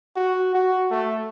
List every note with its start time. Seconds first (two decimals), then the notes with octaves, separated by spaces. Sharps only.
0.16 F#4
0.55 F#4
0.91 A3